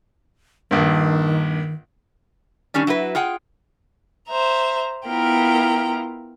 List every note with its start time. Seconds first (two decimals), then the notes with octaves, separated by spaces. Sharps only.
0.71 A#1 G2 D#3
2.74 D#3 G3 C#4 D4
2.87 F#3 E4 F#4 B4
3.15 F4 G#4 F#5 G5
4.28 C5 E5 A#5
5.06 B3 E4 F4 A#4 G5 A#5